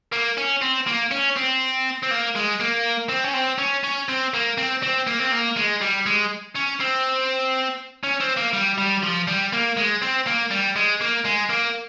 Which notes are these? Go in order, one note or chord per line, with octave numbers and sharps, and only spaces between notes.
A#3
C#4
C4
A#3
C#4
C4
C4
A#3
G#3
A#3
C4
C#4
C4
C#4
C#4
C4
A#3
C4
C4
A#3
C4
A#3
G#3
G3
G#3
C#4
C4
C#4
C4
A#3
G3
G3
F3
G3
A#3
G#3
C4
A#3
G3
G#3
A#3
G#3
A#3